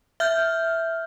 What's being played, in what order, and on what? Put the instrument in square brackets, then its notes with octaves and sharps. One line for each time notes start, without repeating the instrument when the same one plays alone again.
[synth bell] E5 F6 G6